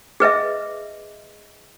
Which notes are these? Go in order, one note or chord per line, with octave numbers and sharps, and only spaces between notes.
G#4 B4 D#5 E5